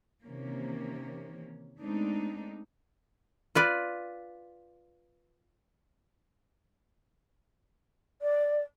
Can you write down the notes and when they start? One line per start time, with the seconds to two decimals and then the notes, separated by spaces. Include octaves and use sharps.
0.24 C3 D#3 E3 A#3 C#4
1.80 G#3 A3 B3 C4 D4 D#4
3.55 F4 B4 D5
8.22 D5